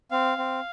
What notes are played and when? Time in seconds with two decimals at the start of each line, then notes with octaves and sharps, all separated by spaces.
0.11 C4 F5
0.38 C4